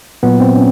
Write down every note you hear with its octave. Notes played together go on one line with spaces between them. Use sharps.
A#2 F#3 B3
C4
C#4